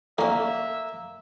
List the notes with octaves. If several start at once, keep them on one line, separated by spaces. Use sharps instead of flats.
D3 A#3 C#4 E5